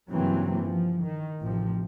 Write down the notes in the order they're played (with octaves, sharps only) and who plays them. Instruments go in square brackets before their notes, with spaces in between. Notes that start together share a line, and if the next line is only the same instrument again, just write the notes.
[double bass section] G2 C#3 E3 F#3 A#3 C4
F3
D#3
A1 C3 F3